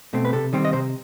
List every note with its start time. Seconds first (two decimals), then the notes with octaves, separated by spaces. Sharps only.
0.13 B2 A3 C4
0.25 B4
0.33 C3 A4
0.53 D#3 G3 C4
0.65 D#5
0.73 C3 C5